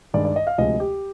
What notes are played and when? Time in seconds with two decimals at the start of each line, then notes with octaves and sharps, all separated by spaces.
0.14 G2 D#3 G#3 D5
0.25 D5
0.36 D#5
0.47 F5
0.58 D2 C3 F3 G#3 D#5
0.80 G4